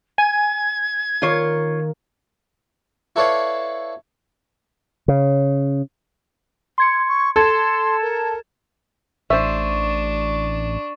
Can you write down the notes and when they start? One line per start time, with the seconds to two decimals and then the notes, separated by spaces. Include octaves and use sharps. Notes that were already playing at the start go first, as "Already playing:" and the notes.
0.18 G#5 G#6
1.22 D#3 A#3 F4 C#5
3.16 E4 A4 B4 C#5 D5 F5
5.08 C#3
6.78 C6 G#6 C#7
7.09 C#6
7.36 A4 C6 G#6 A6 E7
8.02 A#4
9.30 A1 D4 C5 E5 C#6 A6 E7